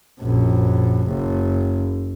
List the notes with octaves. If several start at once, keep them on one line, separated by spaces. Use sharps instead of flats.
A#1 F#2
F#1